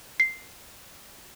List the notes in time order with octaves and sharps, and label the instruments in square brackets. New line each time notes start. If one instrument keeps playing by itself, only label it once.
[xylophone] C7